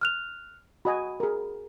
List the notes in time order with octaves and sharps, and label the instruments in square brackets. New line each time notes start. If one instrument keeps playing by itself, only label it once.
[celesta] F6 F#6 F7
[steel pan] F#4 D#5 G#5 [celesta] B5
[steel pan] G#4 A#4